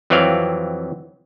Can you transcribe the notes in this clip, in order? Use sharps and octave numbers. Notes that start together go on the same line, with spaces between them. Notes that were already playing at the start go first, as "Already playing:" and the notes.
F2 E3 F#3 C4 D5 F5